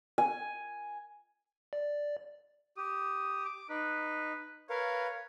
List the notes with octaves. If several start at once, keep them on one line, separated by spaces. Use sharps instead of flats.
G#5
D5
G4 D#6
D6
D#4 B4
A#4 B4 C#5 F5